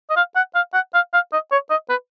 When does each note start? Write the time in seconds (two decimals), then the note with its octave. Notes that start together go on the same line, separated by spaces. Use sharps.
0.10 D#5
0.16 F5
0.36 F#5
0.55 F5
0.74 F#5
0.94 F5
1.14 F5
1.33 D#5
1.52 C#5
1.70 D#5
1.90 B4